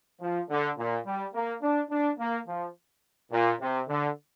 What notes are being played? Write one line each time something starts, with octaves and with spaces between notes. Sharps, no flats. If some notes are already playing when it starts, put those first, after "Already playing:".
F3
D3
A#2
G3
A#3
D4
D4
A#3
F3
A#2
C3
D3